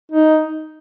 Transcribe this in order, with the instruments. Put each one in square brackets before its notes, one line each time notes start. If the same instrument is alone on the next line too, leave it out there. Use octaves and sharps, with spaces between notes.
[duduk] D#4